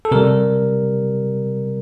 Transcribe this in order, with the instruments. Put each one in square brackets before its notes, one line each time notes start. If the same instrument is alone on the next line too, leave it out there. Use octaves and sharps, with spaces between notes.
[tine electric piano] A4
C3 G3 A#4